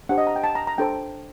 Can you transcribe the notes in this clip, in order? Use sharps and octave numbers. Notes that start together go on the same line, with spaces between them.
D4 G4 C5 F#5
D#5
A#5
G5
A5
A#5
A#5
D4 A4 C5 G5